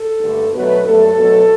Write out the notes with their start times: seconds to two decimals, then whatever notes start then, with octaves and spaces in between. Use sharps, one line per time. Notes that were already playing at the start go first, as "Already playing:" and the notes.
Already playing: A4
0.21 G2 D3 A3
0.53 B2 F#3 A3 B4
0.84 G2 F#3 A3 A4
1.16 B2 F#3 A3